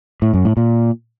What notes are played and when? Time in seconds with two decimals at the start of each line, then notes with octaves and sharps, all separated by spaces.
0.22 A2
0.34 F#2
0.45 A2
0.57 A#2